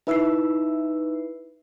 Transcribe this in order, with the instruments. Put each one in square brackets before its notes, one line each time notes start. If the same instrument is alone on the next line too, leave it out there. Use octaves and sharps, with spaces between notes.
[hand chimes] D#4 E6 C7 [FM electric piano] E4 B4 E5